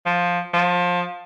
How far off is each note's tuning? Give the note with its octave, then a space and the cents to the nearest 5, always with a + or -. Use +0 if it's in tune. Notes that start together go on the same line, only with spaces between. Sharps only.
F3 +10
F3 +25